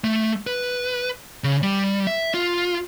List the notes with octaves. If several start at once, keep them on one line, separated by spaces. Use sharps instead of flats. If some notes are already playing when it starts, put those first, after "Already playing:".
A3
B4
C#3
G3
E5
F4